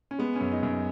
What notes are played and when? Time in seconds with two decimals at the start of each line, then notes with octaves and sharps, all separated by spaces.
0.11 C#4
0.19 G#3 B3
0.36 C#4
0.41 F#2
0.52 D#4
0.63 F#2